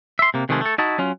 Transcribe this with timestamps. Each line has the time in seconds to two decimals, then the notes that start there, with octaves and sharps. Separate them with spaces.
0.19 E5 C6
0.34 C3 A#3
0.49 C3 D#3 F3 G#3 A3
0.61 A3 A4
0.78 D#4 E4 F#4 D#5 A5
0.98 F#3 C#4 F4